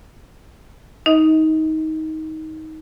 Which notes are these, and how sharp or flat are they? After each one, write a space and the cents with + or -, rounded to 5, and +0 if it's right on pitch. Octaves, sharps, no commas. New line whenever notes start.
D#4 +20 D#5 +35